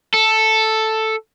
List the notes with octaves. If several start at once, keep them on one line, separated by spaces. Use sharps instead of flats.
A4